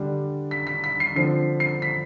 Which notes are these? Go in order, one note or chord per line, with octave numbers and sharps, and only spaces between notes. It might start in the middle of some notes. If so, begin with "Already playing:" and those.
Already playing: D3 G3 D4
B6
B6
B6
C7
D3 F3 C4 C7
C7
B6